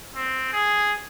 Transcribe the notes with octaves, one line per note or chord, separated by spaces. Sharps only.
C4
G#4